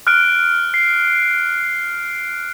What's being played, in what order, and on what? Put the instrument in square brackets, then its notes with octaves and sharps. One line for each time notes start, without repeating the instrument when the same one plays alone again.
[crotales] F6 F#6 D7
C7